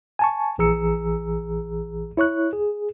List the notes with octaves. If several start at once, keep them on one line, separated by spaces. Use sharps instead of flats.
G#5 A5 C#6
A#1 E3 G#4 A#5 E6 C#7
E4 C#5 C#6 F#6
G#4